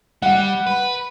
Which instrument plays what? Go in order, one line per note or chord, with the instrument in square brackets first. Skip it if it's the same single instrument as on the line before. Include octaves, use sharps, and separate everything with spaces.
[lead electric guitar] G3 [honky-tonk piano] F#5
[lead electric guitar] B4